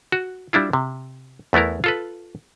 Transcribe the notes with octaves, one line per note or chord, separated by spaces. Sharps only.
F#4
G3 D4 E4 F4
C3
E2 A3 B3 E4 A#4
F4 A4 B4